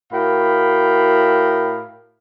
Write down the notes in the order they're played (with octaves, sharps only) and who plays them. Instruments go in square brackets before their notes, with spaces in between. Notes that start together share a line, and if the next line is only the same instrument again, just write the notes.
[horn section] A2 F#4 A#4 F5 G5 B5